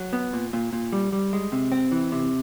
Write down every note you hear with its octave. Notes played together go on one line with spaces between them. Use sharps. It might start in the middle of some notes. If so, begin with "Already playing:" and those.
Already playing: F#3
B3
A#2
A#2
A#2
G3
G3
G#3
C3
C4
E3
C3